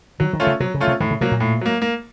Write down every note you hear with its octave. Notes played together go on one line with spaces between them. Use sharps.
D#3 F#3
D#3
A3 C#4 F4
C#3
C3 F#3
C#3
A3 C#4 F4
C3
A2 D#3
C#3
C3 F#3 A#3
A#2
A2
F#3 A#3
A#3